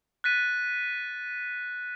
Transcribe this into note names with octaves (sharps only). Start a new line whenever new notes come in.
F#6 A6 B6 D#7